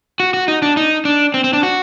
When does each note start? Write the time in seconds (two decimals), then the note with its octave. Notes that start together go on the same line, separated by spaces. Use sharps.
0.20 F#4
0.34 F#4
0.48 D#4
0.62 D4
0.77 D#4
1.05 D4
1.34 C4
1.44 C4
1.53 D4
1.63 F#4